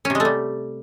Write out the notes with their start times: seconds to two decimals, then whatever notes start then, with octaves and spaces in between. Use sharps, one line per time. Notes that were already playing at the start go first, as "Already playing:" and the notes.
0.05 C#4
0.10 C3
0.15 G#3
0.20 A3
0.25 G3